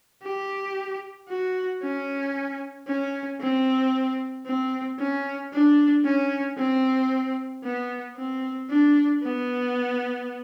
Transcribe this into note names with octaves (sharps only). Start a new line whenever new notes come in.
G4
F#4
C#4
C#4
C4
C4
C#4
D4
C#4
C4
B3
C4
D4
B3